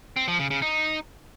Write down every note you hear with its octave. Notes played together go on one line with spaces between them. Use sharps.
C4
F3
C#3
C#3
D#4